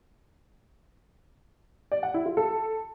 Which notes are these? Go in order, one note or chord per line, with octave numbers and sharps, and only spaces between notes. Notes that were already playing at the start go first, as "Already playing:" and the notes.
D5
F#5
E4
F4
A4